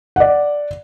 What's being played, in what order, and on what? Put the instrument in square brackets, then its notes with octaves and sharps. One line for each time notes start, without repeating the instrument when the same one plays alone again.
[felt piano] D5 F#5